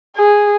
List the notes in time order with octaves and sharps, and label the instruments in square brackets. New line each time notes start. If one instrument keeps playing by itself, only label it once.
[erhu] G#4